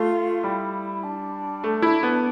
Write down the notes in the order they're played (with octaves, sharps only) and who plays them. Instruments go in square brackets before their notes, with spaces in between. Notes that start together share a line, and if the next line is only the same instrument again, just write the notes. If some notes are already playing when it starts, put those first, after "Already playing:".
Already playing: [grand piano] A3 [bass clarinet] F4
[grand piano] G3 [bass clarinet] E4
[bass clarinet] D4
[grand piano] A3
E4
B3